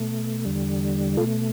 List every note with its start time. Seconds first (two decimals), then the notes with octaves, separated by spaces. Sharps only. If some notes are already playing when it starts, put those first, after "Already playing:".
Already playing: B2 A3
0.45 E2 D3 G3
1.17 B2 F4 A4
1.21 A3